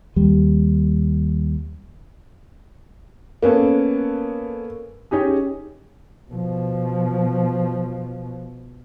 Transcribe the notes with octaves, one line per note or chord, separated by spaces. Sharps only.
D#2 G3
A#3 B3 C#4 A4
C#4 D#4 G4 G#4
B2 F3